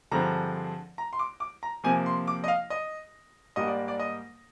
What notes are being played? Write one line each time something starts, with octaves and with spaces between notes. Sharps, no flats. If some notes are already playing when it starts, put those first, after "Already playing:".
G2 D3 F3 G#3 C4 A#5
A#5
C6
D6
D6
A#5
C3 F3 A#3 G#5
C6
D6
D#5
F5
D#5
G#2 G3 A#3 D#5
D5
D5
D#5